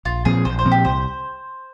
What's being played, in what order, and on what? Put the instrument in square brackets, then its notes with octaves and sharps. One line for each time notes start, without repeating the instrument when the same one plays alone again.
[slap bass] A#1 [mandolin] F4
[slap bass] A#2 F3 C4 [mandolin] G#4
[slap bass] A#1 [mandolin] C5
[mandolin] C5
[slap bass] A#2 F3 C4
[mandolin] G4
[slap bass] C2 [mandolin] C5